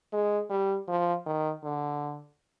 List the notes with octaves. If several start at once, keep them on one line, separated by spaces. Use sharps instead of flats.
G#3
G3
F3
D#3
D3